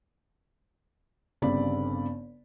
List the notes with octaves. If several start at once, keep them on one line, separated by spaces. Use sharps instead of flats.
G1 G2 C#3 C4 D5 B5